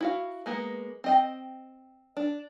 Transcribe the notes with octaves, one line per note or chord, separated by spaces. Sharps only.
E4 F#4 F5
G#3 A#3 B3
C4 D#5 G5
D4